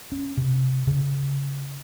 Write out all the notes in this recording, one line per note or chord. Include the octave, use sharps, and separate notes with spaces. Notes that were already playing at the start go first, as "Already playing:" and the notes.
C#4
C3
C#3